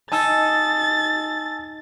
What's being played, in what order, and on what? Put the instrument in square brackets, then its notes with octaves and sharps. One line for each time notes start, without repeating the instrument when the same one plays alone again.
[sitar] D#4 [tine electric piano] G#5 A5 E6 [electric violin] A6